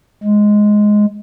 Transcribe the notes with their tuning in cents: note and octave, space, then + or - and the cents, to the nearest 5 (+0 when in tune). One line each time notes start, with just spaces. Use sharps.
G#3 +5